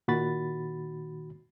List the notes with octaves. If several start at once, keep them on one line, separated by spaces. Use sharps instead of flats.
A#2 D#3 F#4 B5 A6